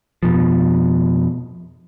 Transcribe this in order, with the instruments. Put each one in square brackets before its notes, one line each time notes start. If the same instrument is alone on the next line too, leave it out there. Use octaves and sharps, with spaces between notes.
[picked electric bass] F2 B2 F3